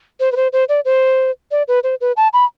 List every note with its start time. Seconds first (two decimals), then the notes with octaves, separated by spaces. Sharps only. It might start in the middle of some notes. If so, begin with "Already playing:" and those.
0.20 C5
0.32 B4
0.36 C5
0.53 C5
0.69 D5
0.85 C5
1.51 D5
1.68 B4
1.83 C5
2.01 B4
2.17 A5
2.33 B5